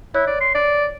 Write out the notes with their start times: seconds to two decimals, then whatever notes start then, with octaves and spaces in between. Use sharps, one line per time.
0.15 E4 C#5 F#6
0.27 D5
0.40 C6
0.55 D5